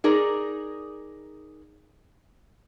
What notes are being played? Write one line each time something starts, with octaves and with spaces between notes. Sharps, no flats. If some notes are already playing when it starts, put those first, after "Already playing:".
D#4 G#4 A#4 D5